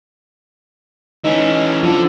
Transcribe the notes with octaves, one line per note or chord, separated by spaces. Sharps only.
E3 C#4 D#4
D3 F3